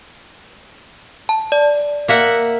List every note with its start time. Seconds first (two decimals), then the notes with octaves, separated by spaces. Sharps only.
1.29 A5
1.52 D5
2.08 A#3 E5 F#5